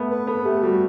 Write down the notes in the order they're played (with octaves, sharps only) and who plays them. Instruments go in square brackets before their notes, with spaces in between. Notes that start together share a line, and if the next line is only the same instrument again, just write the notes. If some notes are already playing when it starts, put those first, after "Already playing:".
Already playing: [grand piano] A3 B3
[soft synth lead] B4
[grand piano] B3 [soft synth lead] A4
[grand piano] A3 [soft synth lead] G4
[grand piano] G3 [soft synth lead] F#4